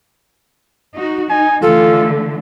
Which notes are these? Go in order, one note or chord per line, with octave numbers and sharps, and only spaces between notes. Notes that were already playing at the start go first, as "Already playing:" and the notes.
D#4 F#4
D#4 G#5
D3 E3 A3 F4 A4